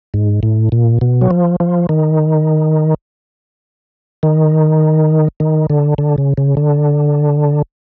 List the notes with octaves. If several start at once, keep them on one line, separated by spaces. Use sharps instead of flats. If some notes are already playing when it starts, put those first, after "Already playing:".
G#2
A2
A#2
B2
F#3
F3
F3
D#3
D#3
D#3
D3
D3
C#3
C#3
D3